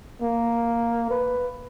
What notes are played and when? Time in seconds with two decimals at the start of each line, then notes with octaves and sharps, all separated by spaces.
0.22 A#3
1.11 B4